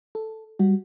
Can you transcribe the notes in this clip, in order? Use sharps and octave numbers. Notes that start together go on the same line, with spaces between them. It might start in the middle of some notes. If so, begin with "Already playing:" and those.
A4
G3 F#4